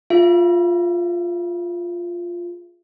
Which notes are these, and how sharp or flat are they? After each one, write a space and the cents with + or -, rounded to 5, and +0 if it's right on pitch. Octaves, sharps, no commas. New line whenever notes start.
F4 +0 G#4 +0 E5 +35